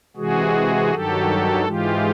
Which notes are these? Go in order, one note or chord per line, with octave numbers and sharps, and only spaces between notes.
C3 E3 G#3 F#4 G#4
G2 D#3 F#3 G4 A4
G#2 E3 G#3 F4 G4